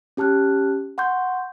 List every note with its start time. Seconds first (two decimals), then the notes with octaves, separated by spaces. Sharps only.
0.17 C#4 G4 A5 F6 F#6
0.98 F#5 C6 C#6 G6